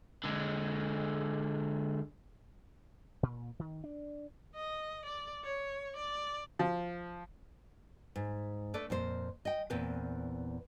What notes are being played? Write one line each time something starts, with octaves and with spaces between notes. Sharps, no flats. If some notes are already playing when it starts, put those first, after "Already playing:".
D3 G#3
A#2
D#3
D4
D#5
D5
C#5
D5
F3
G#2
A3 D4 A4 B4 D5
F2 A#2 C5
D#5 G5
E2 A#2 C4 B4